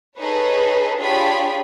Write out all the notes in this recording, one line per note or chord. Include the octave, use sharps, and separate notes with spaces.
D#4 G#4 A4 B4 C#5
D4 F4 G4 G#4 C#5 B5